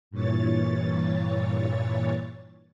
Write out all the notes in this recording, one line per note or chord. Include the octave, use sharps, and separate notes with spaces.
G2 A#2 E3 C#5 A6